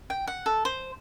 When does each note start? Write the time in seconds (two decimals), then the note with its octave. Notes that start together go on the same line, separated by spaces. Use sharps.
0.10 G5
0.27 F#5
0.46 A4
0.65 C5